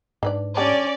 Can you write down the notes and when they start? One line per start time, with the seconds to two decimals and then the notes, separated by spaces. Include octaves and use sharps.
0.23 G#2 D4 B4 D5
0.57 D3 G3 C#4 D4 D5